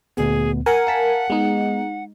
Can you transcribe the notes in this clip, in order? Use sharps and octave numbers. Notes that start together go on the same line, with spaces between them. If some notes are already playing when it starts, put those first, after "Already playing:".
D2 A#2 B3 G#4
A#4 F#5 G#5
F5 A5 B6
G#3 B3 D#4